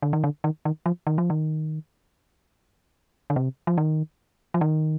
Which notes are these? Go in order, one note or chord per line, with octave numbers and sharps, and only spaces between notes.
D3
D#3
D3
D#3
D#3
F3
D#3
F3
D#3
D3
C3
F3
D#3
F3
D#3